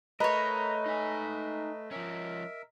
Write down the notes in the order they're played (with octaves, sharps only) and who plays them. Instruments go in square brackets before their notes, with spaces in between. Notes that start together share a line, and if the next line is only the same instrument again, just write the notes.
[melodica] A3 [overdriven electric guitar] A#4 [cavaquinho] B4 C#5 [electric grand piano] D#5 A#5
[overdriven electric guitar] D#4 G#5
[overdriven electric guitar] F3 C#4 [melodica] A#4 E5